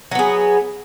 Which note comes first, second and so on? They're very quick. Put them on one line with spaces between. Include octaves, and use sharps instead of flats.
F#3 B3 G#4